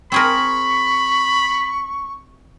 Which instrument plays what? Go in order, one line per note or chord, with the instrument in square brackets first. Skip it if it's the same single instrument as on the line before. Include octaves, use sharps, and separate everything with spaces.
[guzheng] C4 G#4 A#4 [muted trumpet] B5 [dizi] C#6